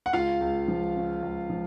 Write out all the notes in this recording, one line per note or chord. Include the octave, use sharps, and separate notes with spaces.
F#5
C#2 F4 F5
C#2
F3
C#3
C#2
F3